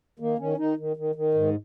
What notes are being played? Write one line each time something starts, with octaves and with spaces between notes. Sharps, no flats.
D#3 A#3
D#3 C#4
D#3 D#4
D#3
D#3
D#3
G#2